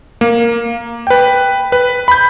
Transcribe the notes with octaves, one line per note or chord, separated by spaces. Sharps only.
A#3
B4 G5
B4
B5 G6